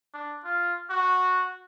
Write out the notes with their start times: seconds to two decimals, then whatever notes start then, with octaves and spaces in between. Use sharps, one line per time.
0.14 D4
0.44 F4
0.90 F#4